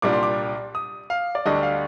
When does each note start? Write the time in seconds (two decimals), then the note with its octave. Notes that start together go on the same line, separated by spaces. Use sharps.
0.02 C2 A#2 G3 D4 D6
0.13 C6
0.23 D6
0.75 D#6
1.10 F5
1.35 D5
1.46 D2 D3 G3 D4 D#5
1.63 F5